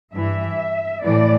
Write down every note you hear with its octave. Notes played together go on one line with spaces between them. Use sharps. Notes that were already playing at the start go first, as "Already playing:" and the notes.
G2 E3 E5
A2 E3 D5